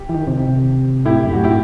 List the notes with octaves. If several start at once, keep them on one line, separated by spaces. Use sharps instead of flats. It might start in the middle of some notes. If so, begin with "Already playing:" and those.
Already playing: G4
E3
D#3
C3
A2 E4 G4
F#2
A2 F#4
E4 G4